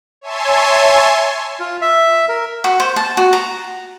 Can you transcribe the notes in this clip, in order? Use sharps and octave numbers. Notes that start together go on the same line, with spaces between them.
C#5 E5 G#5 A5 C6
F4
E5
A#4
F#4
C5
A5
F#4
A#5